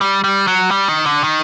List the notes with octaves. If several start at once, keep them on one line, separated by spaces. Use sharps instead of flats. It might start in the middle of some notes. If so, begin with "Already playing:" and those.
G3
G3
F#3
G3
D#3
D3
D#3